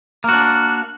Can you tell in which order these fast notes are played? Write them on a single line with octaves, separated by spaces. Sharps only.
A#3 F#4 D4